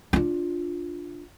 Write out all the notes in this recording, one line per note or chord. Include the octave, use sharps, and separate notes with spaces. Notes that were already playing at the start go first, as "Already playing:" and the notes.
D4 F4